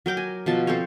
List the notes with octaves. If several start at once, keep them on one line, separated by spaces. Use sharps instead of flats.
F#3 A#4 G5 D6
G#5
B2 F3 A5
C4 A4 C5 C#5